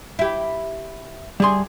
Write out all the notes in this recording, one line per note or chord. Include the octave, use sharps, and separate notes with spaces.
E4 G4
D2 G3 G#4 C6